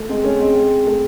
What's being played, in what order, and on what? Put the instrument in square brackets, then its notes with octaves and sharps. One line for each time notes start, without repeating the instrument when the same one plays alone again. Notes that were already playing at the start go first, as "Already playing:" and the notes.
Already playing: [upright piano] A3
G#3 C4
A3 C#4
G#3 C4
G#3 C4
A3